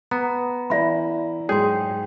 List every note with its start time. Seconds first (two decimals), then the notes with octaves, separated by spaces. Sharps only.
0.11 B3 A#5
0.70 E3 E4 D5 E5 B5
1.49 G#2 F#3 G#3 G#4 C#5 G5 C6